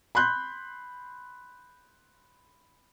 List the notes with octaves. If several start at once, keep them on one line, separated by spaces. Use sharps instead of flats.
B5 C6 F#6 G6